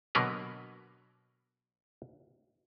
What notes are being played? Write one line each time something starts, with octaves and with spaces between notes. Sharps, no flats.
B2 D3 F#3 A#3 A#4 B4